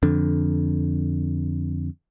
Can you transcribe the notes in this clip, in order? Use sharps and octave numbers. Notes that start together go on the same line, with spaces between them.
F2 D3